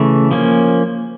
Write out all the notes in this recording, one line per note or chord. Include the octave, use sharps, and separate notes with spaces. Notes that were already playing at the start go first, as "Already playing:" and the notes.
Already playing: C#3 E3 A3
F3 A#3 C#4